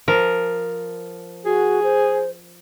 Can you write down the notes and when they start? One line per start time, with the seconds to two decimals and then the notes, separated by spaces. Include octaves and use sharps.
0.08 F3 A#4
1.45 F#4 G#4
1.84 C5